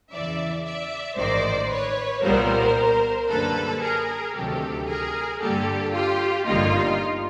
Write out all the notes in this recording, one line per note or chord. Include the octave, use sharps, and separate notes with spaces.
E2 C#3 E3 D5 E5
D5 E5
A1 G#2 D#3 C5 D5
B4 C#5
C2 A#2 G3 B3 A#4 C5
F#2 D3 G3 A#3 A4 B4
G#4 A#4
D2 C3 D#3 F#3 A3 G4 A4
G#4 A#4
G2 D3 G3 A#3 G4 A4
F4 G4
G1 G2 D3 G3 A#3 D#4 F4